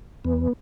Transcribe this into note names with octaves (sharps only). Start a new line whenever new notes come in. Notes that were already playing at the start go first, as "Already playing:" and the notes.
E2 B3